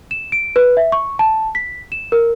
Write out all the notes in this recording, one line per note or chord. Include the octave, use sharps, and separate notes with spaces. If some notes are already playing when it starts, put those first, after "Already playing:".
E7
D7
B4
E5
C#6
A5
B6
E7
A#4